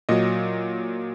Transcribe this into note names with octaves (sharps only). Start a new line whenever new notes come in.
A#2 F#3 D#5